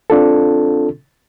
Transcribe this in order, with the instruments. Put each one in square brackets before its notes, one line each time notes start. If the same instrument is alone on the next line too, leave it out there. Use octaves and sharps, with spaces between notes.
[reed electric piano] C4 D4 F4 A4